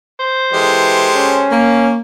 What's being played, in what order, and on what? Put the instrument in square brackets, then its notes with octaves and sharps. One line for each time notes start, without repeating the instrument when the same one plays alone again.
[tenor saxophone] C5
[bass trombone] E3 [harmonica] G#3 G4 A4
[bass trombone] C#4
[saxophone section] A#3